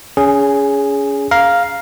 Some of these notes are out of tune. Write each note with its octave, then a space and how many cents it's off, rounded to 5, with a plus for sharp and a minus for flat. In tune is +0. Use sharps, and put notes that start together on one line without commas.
C#4 +25 G#4 +0
F5 +0 A#5 +10